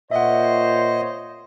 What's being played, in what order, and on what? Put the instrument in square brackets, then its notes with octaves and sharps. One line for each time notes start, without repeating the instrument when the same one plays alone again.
[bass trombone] A#2 [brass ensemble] C5 C#5 [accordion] D#5 [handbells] E5 F#5